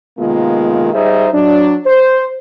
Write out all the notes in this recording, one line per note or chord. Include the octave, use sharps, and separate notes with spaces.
C3 D#3 G#3 A#3 B3 F4
G3 D#4 G#4 C5 D#5 E5
F#3 D4
C5